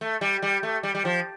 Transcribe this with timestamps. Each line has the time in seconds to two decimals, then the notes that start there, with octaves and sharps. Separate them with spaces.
0.01 A3
0.21 G3
0.42 G3
0.63 A3
0.83 G3
0.95 G3
1.05 F3